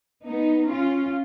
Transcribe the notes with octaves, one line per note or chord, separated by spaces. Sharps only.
B3 D#4
C#4 F4